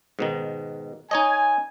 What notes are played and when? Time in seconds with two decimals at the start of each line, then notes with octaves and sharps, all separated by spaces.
0.19 G#2 B2 D#3
1.11 D#4 C#5 D#5 G#5